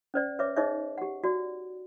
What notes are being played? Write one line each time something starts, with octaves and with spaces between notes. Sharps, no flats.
C#4 C5 D5
B4 C#5 E5 D6
D#4 G#4 C5 C#5 D#5 E5
G4 F#5
F#4 D5